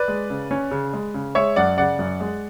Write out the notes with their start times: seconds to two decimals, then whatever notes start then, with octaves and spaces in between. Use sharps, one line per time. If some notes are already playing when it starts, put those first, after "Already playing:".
Already playing: B4 D5
0.08 G#3
0.30 C#3
0.51 C#4
0.71 C#3
0.93 G#3
1.14 C#3
1.35 G#3 C#5 E5
1.56 F#2 D5 F#5
1.78 C#3 D5 F#5
1.99 F#2
2.20 G#3